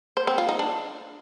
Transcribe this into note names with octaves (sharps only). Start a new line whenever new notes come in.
C5
C4
F4
D#4
D4